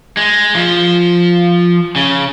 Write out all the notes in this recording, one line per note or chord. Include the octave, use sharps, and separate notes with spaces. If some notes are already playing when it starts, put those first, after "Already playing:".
G#3
F3
C#3